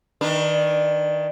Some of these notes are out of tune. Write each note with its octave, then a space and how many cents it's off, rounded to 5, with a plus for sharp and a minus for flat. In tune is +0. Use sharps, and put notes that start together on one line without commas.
D#3 +10 D4 +25 B4 -15